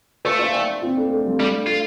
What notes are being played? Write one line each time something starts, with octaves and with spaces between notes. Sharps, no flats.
A3 C5 F5
C5 F5
D5 G5
C4 F4
A3 D4
A3
G3 C4
G3 A3 D4
A3 F4